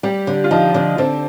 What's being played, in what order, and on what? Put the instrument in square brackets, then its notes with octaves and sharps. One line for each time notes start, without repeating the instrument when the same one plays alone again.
[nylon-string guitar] G3 [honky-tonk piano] G4
[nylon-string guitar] D3
[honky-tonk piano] F4
[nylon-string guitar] F3 [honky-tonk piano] D#4
[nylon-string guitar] D3
[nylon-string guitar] D3 [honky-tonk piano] C4